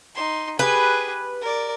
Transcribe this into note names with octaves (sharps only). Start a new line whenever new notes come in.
D#4 C6
G4 G#4 B4
A#4 D5